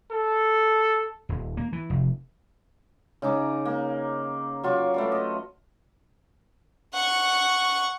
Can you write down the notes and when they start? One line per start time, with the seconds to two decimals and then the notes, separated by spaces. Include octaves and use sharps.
0.11 A4
1.29 D#1
1.57 A#3
1.73 E3
1.90 F1
3.22 C#3 D#4 A#5 D6
3.65 A#3
4.63 F#3 F4 C#6 D6
4.94 A3 B4 D5
5.12 D#5
6.95 F#5 C#6